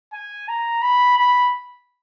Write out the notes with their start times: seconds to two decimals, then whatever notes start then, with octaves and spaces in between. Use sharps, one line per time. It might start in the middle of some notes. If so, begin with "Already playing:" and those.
0.13 G#5
0.49 A#5
0.82 B5
1.18 B5